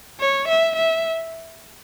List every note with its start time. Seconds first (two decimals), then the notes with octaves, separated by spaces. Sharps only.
0.20 C#5
0.48 E5
0.76 E5